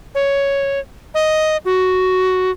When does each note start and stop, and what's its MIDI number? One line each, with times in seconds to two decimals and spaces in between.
0.15 0.79 73
1.14 1.57 75
1.65 2.51 66